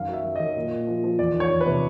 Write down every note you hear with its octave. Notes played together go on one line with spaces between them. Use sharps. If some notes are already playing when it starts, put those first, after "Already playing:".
Already playing: F#2 D#3 F5
F#3 E5
F#2
D#3 D#5
A#2
A#2
F3
F3
E2 D5
D#3
C#5
E2
B4
C3